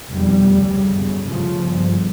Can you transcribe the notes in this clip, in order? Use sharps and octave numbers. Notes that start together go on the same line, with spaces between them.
F1 E2 B2 G3
D2 C#3
G1 F#2 C#3
D2 C#3 F3
G1 G2